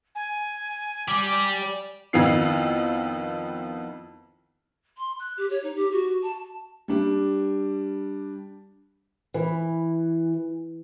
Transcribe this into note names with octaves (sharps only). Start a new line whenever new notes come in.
G#5
G4 D5
F2 D#3 B3 E4 F4 C7
C6
F#6
G4
C#5
D#4
G4
F#4
A5
G3 D4
E3